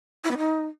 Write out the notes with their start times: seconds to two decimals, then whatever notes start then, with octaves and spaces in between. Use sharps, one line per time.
0.24 E4
0.31 B3
0.38 D#4